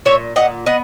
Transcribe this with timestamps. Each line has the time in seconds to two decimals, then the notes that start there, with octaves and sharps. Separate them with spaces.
0.05 A#2 C#5 E5
0.36 A#2 D#5 F#5
0.66 B3 D#5 F#5